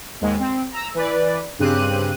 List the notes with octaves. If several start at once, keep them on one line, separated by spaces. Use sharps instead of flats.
D#2 G#2 G#3
C4
A#5 E6
E3 B4 D5
G2 C#3 C4 G4 F#6 D#7